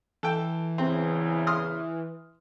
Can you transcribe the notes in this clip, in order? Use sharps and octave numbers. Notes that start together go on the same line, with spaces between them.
E3 A4 G5
E2 C#3 C4 E4
C6 D#6 F6